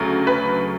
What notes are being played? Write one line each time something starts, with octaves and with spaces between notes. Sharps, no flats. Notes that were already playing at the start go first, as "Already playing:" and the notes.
Already playing: D2 C#3 F#3 A3
B4